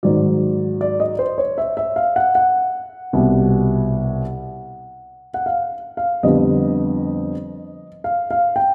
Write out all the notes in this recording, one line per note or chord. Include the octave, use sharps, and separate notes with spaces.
G#2 D#3 F#3 D5
D5
D#5
C5
C#5
E5
E5
F5
F#5
F#5
C2 B2 G3
F#5
F5
F5
F2 D3 G3 B3 D#5
F5
F5
G5